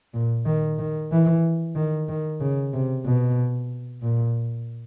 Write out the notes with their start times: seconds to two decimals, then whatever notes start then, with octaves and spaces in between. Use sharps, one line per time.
0.14 A#2
0.46 D#3
0.79 D#3
1.12 E3
1.75 D#3
2.09 D#3
2.40 C#3
2.73 C3
3.05 B2
4.02 A#2